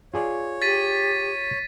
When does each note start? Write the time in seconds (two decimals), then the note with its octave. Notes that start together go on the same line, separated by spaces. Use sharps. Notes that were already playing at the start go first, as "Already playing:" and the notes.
0.14 F4 G#4 C#5 D5
0.62 G4 A6 B6 D#7